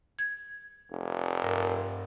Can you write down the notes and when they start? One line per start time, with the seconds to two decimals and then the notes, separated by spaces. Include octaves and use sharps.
0.19 G#6
0.91 F1
1.43 G2 A#4